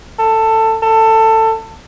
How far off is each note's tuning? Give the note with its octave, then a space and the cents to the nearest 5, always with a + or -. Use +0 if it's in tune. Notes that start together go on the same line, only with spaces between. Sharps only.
A4 +15
A4 +20